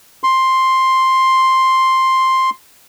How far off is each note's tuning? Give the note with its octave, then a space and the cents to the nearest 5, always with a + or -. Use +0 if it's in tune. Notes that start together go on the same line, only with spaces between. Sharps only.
C6 +5